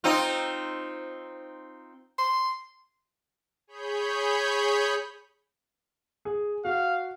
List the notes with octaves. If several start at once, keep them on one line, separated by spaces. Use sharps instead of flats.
C4 D#4 F4
C6
G#4 C#5 B5 G6
G#4
F#4 F5